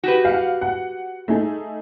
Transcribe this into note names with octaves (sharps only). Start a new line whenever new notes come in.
F#4 G4 B4
F5 F#5
F#5
A3 D#4 G#4